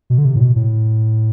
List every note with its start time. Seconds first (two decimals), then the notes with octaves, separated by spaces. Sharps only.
0.10 B2
0.18 D3
0.25 C3
0.36 A2
0.41 B2
0.56 A2